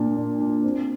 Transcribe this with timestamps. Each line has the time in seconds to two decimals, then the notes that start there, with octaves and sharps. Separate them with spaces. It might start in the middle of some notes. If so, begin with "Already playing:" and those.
Already playing: A#2 D4
0.17 D4
0.41 D4
0.63 C4